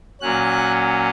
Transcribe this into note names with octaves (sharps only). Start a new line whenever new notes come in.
A#2 F#3 C#4 F#6